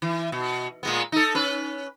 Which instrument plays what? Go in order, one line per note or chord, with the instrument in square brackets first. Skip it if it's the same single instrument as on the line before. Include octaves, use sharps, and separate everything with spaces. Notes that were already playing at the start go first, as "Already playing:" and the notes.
[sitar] E3
B2
A#2 G#3 B3
D#4 A4
C#4 B4